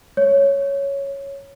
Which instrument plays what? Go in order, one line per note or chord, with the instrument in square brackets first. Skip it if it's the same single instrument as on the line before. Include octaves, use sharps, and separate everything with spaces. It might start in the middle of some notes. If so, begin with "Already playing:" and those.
[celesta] C#5